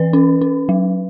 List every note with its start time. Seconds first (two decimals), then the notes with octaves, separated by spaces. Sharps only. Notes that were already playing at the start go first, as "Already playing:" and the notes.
Already playing: E3 B4
0.13 C#4
0.41 C#4
0.69 F#3